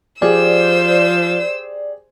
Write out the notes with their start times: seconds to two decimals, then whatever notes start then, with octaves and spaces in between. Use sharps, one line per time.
0.22 F3 G4 G#4 C5 D5 E6